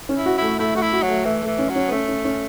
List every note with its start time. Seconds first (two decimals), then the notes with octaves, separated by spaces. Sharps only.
0.09 C#4
0.15 E4
0.26 F#4
0.37 A3 E4
0.59 A3 E4
0.75 A3 F#4
0.82 E4
0.93 F#4
1.03 F#3
1.09 A3
1.25 E3 A3
1.42 E3 A3
1.59 C#4
1.69 F#3
1.76 C#4
1.88 B3
1.91 A3 C#4
2.08 C#4
2.25 C#4